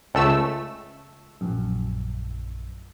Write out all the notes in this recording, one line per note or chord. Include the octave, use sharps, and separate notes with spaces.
C#2 A3 E6
A#1 F#2